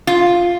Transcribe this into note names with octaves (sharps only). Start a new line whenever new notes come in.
F4